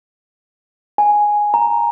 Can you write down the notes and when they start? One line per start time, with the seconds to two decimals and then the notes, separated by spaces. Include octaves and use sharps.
0.98 G#5
1.54 A#5